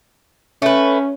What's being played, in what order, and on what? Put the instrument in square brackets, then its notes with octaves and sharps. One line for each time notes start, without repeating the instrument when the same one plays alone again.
[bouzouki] A3 B4 [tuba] C#4